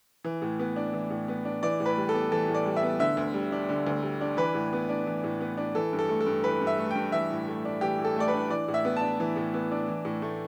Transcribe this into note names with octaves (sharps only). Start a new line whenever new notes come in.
E3
A2
B3
D4
E3
A2
B3
D4
E3 D5
A2
B4
G3
A4
B3
E3 A4
A2
D5
G3
E5
B3
D3 E5
D2
G3
D4
D3
D2
G3
D4
E3 B4
A2
B3
D4
E3
A2
B3
D4
E3 A4
G2
A4
A3
A4
G2
E3 B4
G2
E5
A3
G2 G5
E3 E5
A2
A3
D4
E3 G4
A2
A4
A3 D5
B4
D4
E3 D5
A2
E5
B3
A5
D4
E3
A2
B3
D4
E3
A2
A3